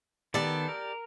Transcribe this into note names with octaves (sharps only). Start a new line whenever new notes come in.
D#3 B3 G4 A4 D5
A#4